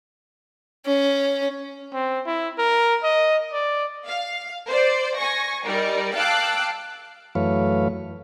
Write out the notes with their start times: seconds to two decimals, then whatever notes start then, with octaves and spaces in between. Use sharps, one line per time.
0.85 C#4
1.93 C4
2.26 E4
2.58 A#4
3.03 D#5
3.53 D5
4.06 F5
4.69 C5 D5
5.15 G#5 C#6 A#6
5.65 G3 D#4 A#4 D5
6.14 F5 G5 A5 D6 E6 F#6
7.35 F#2 E3 A3 B4 C#5 F5